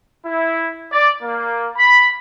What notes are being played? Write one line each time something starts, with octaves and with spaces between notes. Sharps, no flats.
E4
D5
A#3
B5